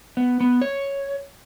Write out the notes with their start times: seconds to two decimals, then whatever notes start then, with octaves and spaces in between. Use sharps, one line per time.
0.17 B3
0.40 B3
0.62 C#5